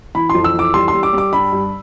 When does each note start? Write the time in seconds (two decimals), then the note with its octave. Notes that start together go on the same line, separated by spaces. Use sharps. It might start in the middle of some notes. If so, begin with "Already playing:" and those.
0.15 E3 B5
0.29 F2 C6
0.44 E6
0.54 E3
0.59 D6
0.74 G3 C6
0.88 C6
0.94 G3
1.03 D6
1.13 G3
1.18 D6
1.33 G2 B5
1.52 G2